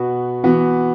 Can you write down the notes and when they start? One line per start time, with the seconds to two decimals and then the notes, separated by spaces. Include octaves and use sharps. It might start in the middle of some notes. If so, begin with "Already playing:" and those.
Already playing: B2 B3 F#4
0.44 E3 B3 F#4